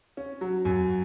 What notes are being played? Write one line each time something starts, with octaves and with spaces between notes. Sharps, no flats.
C#4
F#3
F#2